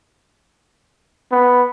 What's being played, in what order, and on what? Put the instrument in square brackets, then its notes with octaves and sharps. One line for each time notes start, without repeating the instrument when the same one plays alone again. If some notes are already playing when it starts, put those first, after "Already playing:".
[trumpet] B3